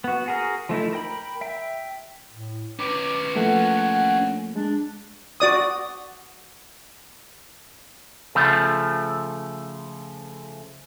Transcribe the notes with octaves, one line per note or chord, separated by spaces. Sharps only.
B3 F#4
F#4 G#4 A#4
F3 A3 D#4 E4
A#4 G5 B5
E5 G5
A2
C#4 B4 D6
F3 A3 A#3 F#5
G#3 D4
F#4 D5 D#6
C#3 F3 A3